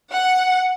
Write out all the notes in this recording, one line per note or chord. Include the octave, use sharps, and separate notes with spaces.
F#5